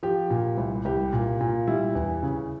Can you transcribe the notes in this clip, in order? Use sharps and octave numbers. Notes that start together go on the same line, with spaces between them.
F3 G4
A#2
C2
C2 G4
A#2
A#2
G3 E4
E2
C#3